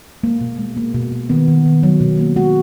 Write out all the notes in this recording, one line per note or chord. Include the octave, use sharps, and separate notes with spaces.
G#3 A#3
B2
G#3
A#3
B2
B2
D#3 B3
D#3
D#3
F#3
B2
A#3
G#3 F#4